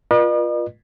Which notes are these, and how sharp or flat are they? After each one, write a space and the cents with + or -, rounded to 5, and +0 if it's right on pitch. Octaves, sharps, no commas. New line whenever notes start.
F4 +0 B4 -45 D#5 -45